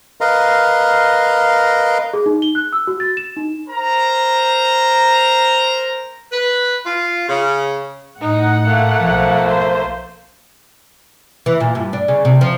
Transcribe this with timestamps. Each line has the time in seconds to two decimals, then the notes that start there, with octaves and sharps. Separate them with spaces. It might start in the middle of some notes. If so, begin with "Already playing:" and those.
0.21 A#4 B4 D#5 F5 A#5 C6
2.14 G#4
2.26 D#4
2.42 G7
2.55 F#6
2.72 E6
2.87 F#4
3.00 A6
3.17 E7
3.36 D#4
3.68 A#4 C5 A#5
6.32 B4
6.86 F4
7.29 C#3
8.21 A2 D#4 D#5 F#5
8.66 A3 A#3
9.02 B1 F3
9.48 C5
11.46 E3
11.60 A#2
11.75 G2
11.93 D4
12.08 C#3
12.25 C3
12.41 F3